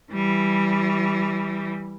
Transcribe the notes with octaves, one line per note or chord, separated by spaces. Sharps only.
E3 G3